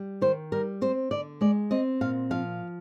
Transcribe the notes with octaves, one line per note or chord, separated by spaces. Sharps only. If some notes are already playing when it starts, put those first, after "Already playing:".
Already playing: G3
D#3 C5
G3 A#4
C4 C5
D3 D5
G#3 D5
C4 D#5
A#2 F5
F3 F5